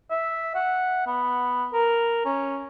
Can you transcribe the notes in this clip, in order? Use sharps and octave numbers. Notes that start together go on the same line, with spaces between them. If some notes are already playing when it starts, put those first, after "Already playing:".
E5
F#5
B3
A#4
C#4